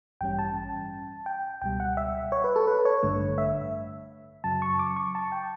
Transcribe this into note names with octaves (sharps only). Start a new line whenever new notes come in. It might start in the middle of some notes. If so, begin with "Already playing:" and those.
A1 G2 E3 G3 C#4 G5
A5
G5
C#2 B2 G3 G5
F#5
E5
C#5
B4
A4
B4
C#5
A1 G2 D3 A3
E5
F#2 C#3 F#3 A5
C#6
D6
C#6
A5
G5